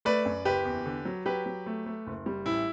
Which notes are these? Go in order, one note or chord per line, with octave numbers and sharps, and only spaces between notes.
A3 B4 D5
F#2
F#1 G4 B4
E2
D3
F#3
F#3 G4 B4
F#3
A3
A3
F#1
G3
A1 E4